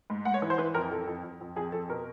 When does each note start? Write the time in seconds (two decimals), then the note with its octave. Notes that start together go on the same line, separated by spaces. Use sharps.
0.10 G#2
0.25 G#2 F#5
0.34 C#5
0.42 E3
0.50 C5
0.58 E3 B4
0.74 F2 A#4
0.91 F2 A4
1.07 F2
1.24 F2
1.41 F2
1.56 F2 G#4
1.72 F2 A4
1.89 B2 A#4